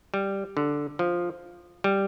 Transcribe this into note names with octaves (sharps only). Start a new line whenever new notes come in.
G3
D3
F3
G3